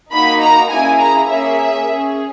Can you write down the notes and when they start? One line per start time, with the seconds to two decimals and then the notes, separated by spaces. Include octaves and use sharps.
0.12 A#3 D#4 F#4 B5
0.41 A#5
0.70 A#3 C#4 E4 G#4 G#5
0.99 A#5
1.28 A#3 C#4 G#4 E5
1.86 C#4 G#4